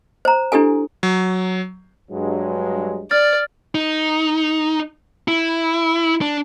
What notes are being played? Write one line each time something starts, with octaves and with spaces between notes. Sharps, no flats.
C5 A#5
D4 E4 G4 A4 G#5
F#3
G2 F#3 G#3
D5 F6 A6
D#4
E4
D4